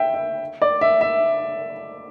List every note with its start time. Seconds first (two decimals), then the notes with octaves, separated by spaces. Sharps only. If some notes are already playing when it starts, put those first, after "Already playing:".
Already playing: E5 G5
0.14 E5
0.62 D5
0.81 E5
1.01 E5